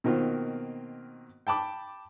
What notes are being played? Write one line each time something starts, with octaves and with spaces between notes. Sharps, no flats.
B2 D#3 A#3 C4 F4 A#4
G5 A5 B5 D6